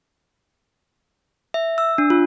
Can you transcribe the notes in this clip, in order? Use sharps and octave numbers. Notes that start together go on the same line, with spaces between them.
E5
E6
D4
F4